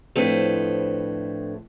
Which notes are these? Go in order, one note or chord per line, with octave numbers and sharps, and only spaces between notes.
A2 F3 C4 D4 A4 B4